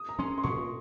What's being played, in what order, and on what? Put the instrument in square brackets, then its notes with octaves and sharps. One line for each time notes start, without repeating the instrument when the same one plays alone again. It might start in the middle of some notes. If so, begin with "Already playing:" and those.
Already playing: [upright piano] D#6
A#5
[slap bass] F#3 C#4 [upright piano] C6
[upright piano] C6
[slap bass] A#2 [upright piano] C#6